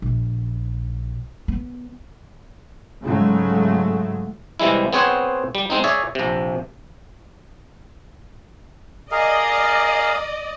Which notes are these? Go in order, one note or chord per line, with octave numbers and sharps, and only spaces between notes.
A#1
B3
G#2 C#3 F#3 G#3 A3
C3 E3 G3 G#3 E4
B3 C4 G#4 C5 C#5 F#5
G3
G#3 C4 D#4
G#4 C#5 D5 E5
A#1 C3
G#4 A#4 D5 D#5 F5